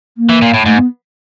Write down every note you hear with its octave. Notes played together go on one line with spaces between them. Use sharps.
A#3
E3
A#2
A2
G#2 A3
B3